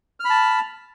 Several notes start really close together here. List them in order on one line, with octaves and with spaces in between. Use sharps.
F6 B5 A5